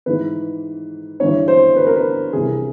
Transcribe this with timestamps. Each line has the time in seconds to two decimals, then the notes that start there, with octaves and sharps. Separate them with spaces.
0.06 G#2 E3 B4
1.20 G2 E3 C#5
1.48 C5
1.76 B4
1.86 A#4
1.95 B4
2.33 C2 C3 E3 G#4